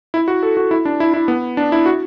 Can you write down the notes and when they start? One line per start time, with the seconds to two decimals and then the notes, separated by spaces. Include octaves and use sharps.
0.14 E4
0.28 F#4
0.43 A4
0.57 F#4
0.71 E4
0.85 D4
1.00 E4
1.14 E4
1.28 B3
1.57 D4
1.72 E4
1.86 F#4